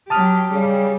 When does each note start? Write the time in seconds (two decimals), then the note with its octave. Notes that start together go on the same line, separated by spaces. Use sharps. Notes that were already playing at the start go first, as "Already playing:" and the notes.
0.10 F#3 G4 A5 D#6 F6
0.52 C#3 G3